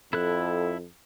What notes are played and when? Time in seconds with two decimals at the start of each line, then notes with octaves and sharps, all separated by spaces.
0.13 F2 E4 A4 F#6